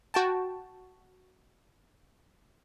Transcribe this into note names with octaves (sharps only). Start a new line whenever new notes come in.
F#4 G5 A5